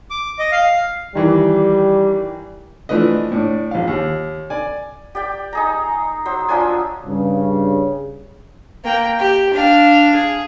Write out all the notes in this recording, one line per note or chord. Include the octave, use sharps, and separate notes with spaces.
D6
D#5
F5
D#3 E3 G3
E3 F3 A3 D4 B4 D#5
A2 D4
A#1 F5
D#2
D5 G#5
G4 D5 G5
D#4 G#4 A#5
F#3 C5
F3 F#3 D4 G#5
G2 C#3
A#3 G5
G4
D4 F5
G#4